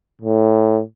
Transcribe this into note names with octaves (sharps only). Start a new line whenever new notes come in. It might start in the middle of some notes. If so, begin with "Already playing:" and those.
A2